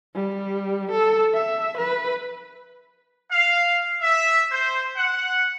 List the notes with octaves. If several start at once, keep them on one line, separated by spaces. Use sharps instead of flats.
G3
A4
E5
B4
F5
E5
C5
F#5